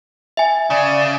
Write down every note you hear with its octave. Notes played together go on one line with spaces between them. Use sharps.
E5 G#5
C#3 D5